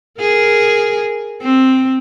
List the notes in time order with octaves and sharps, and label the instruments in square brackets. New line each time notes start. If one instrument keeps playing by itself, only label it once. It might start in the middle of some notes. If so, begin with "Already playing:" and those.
[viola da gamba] G#4 A#4
C4